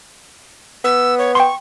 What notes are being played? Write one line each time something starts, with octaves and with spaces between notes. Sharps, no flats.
B3 E6
C#5
G5 C6 C#6